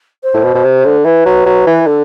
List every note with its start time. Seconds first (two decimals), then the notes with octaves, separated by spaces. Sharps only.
0.23 C5
0.34 A2
0.44 B2
0.54 B2
0.64 C3
0.85 D3
1.05 E3 B4
1.26 F#3
1.46 F#3
1.67 E3
1.87 D3 A4